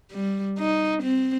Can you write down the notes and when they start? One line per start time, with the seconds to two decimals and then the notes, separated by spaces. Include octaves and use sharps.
0.11 G3
0.59 D#4
1.03 C4